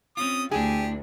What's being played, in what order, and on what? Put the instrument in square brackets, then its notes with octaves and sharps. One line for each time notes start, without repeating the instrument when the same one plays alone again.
[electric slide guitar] C4 C#4 F4 [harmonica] D#6
[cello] D2 [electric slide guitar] D4 E4 [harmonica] G4 [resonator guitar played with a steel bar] G#4